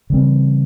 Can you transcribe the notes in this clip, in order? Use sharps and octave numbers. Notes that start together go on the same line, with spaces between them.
C#3 E3 G3 C4